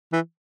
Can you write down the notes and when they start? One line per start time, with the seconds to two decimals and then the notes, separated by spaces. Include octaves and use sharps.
0.13 E3